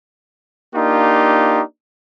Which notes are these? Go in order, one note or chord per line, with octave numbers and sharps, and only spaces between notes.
A#3 D4 D#4 F4 G4